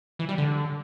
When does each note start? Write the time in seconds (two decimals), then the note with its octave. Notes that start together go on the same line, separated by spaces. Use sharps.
0.19 E3
0.29 G3
0.38 D3